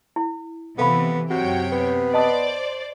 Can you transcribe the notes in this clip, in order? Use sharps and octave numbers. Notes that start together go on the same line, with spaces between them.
E4
C3 E3 B3 A4 F5 B5
F#2 C3 F#4 C#5 G5
B3
C5 D5 D#5 A5 D#6